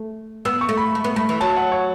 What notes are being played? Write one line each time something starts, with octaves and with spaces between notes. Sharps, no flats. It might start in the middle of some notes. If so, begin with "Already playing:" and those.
Already playing: A3
B3 E6
C#6
A3
B5
A3 B5
B3
A3 B5
E3
F#3 A5
F#5
C#5